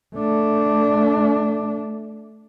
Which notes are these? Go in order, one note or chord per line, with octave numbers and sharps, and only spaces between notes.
A3 D4